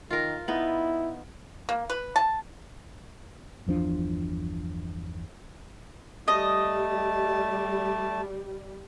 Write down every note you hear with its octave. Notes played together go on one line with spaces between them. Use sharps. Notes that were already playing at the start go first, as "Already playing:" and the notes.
D#3 F4 A#4
B3 D#4 E4
A#3
B4
A5
G1 E2 F3 D4
G3 A3 D#5 A5